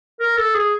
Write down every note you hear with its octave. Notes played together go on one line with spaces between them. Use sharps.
A#4
A4
G#4